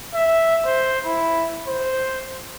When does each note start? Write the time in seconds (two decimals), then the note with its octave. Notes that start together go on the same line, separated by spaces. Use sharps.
0.14 E5
0.65 C5
1.05 E4
1.68 C5